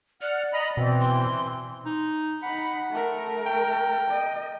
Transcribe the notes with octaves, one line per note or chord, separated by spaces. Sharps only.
D5 F#5 F6
D#5 A#5 B5
B2 E3 C4
C6
D#4
D#4 F#5 B5
A3 A#4
G5
D#5